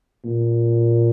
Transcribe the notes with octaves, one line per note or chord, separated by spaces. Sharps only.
A#2